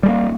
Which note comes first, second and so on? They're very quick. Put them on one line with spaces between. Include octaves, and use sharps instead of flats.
G3 G#3 A#3